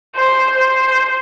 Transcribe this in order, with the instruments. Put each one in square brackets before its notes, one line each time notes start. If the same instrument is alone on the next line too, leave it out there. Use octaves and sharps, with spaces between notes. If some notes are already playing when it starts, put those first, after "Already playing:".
[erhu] C5
C5